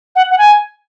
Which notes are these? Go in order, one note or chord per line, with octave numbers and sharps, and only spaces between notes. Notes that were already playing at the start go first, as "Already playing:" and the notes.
F#5
F#5
G#5